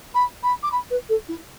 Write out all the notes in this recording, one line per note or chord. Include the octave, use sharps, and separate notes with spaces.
B5
B5
D6
B5
B4
A4
E4